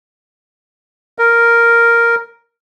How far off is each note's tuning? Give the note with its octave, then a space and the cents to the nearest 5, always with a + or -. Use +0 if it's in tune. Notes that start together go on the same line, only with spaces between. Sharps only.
A#4 +0